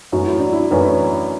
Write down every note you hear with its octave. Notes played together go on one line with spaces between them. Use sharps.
F#2 E3 A3 C#4 F#4
E4
D4
E4
F#2 E3 A3 C#4 B4